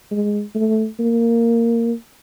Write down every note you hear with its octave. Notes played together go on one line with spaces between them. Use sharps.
G#3
A3
A#3